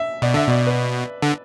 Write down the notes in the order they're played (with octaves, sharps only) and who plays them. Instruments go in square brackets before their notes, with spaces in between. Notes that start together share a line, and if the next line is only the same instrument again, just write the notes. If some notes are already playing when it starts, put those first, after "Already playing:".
Already playing: [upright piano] E5
[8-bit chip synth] B2 [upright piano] D5
[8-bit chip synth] D3 [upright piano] E5
[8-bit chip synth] B2 [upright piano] D5
[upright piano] B4
[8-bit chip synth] D3